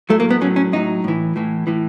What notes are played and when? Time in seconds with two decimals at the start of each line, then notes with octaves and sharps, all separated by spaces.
0.10 A2 F#3 A3
0.20 A#3
0.30 B3
0.41 A2 F#3 C#4
0.56 C#4
0.73 A2 F#3 D#4
1.04 A2 E3
1.36 A2 E3
1.67 A2 E3